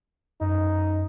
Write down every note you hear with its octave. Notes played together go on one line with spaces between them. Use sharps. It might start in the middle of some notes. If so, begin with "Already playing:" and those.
F#2 D#4